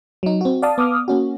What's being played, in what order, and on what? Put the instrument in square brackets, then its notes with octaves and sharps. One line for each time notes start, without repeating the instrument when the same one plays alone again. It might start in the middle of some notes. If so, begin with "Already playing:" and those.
[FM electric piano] F#3 D#4
C4 F#4
D5 F5 A5 D#6
B3 D6 D#6 F6
A#3 C#4 F#4